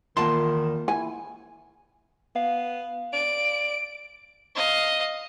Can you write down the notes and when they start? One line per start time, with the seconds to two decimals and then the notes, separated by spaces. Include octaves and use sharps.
0.17 E2 D#3 A#3 F4 A5 C6
0.88 E4 G#5
2.36 B3 F5
3.13 D5 D7
4.56 D#5 F5